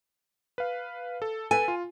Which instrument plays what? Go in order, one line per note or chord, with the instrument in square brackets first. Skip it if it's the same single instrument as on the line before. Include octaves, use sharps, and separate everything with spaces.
[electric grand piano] B4 F5
A4
[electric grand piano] A4 B4 [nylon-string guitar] G#5
[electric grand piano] F4